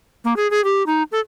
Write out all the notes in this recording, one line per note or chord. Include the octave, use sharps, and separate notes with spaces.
A#3
G#4
G#4
G4
D#4
A4